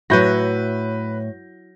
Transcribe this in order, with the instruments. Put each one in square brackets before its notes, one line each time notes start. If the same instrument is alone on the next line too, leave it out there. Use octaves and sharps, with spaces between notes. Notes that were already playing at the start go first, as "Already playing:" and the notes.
[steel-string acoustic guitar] A2 C#5 [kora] F#3 E4 F#4 [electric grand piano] B4 G6 A#6